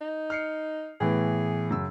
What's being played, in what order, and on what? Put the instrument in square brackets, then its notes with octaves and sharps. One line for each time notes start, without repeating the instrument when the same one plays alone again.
[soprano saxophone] D#4
[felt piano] F6 C7 C#7
[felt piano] A2 E3 B3 [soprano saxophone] G#4
[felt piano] F#2 C#3 E6